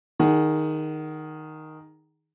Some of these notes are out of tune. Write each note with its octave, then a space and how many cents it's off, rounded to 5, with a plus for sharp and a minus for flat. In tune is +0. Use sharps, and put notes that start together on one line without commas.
D#3 +0 G#4 +0 F#5 +30